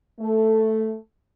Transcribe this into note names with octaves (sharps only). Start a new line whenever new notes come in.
A3